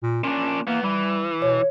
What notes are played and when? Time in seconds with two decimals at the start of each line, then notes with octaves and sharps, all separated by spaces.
0.03 A#2
0.24 A#2 C#4 D4
0.67 E3 A#3 B3
0.83 E3 G3
1.42 B2 C#5